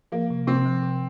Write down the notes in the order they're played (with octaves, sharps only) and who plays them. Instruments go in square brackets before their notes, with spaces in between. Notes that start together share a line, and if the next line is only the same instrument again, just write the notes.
[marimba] F3 [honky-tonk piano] A#3
[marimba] C3
[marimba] C3 [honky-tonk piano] C4
[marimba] F3
C3